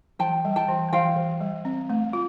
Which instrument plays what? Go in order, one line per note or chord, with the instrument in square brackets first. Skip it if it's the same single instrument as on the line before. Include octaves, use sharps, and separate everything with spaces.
[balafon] E3 [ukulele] G5 A5
[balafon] G3
[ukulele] G5 A5
[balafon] E3
[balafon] E3 [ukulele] F5 G5
[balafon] E3
G3
C4
A3
F4